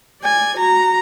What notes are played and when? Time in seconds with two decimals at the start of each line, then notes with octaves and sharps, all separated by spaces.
0.22 D5 G#5
0.58 F#4 A#5